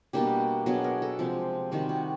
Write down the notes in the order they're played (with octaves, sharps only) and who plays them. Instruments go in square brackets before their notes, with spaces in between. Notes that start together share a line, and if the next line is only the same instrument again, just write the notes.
[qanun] B2 G3 A#3 D4 G4
B2 F#3 B3 D4 G#4
A#4
A4
C3 F3 G#3 C4 G4
C3 D#3 G3 C4 F#4
F#4